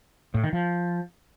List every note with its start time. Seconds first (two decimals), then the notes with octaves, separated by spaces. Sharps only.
0.34 A2
0.44 D#3
0.53 F3